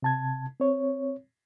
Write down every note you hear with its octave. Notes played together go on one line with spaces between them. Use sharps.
C3 A5 G#6
C4 C#5